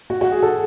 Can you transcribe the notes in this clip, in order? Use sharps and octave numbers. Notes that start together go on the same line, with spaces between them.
F#4
F#4
G#4
A4